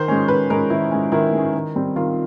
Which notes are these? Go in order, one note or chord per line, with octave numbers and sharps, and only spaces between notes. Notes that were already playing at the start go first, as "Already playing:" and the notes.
Already playing: D#3 C5
G#3 C#4
D#3 B4
G#3 C#4 A#4
D#3 E4
G#3 C#4
D#3 E4
G#3 C#4
D#3
G3 C4
D#3 F4